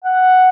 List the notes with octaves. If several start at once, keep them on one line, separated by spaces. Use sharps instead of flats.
F#5